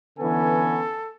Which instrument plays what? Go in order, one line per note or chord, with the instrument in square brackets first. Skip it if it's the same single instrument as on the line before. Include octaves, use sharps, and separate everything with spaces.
[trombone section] D3 E3 B3 [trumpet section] C#4 G#5 [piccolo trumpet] A4